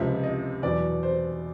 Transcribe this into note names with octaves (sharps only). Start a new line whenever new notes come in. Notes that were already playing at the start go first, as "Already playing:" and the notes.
Already playing: C#2 C3 F3 E5
D#5
E2 B2 F#3 D5
C5